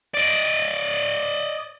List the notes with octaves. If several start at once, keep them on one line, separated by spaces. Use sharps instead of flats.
D5 D#5